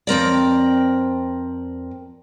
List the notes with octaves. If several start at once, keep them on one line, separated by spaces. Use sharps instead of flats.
F2 C4 A#4 D5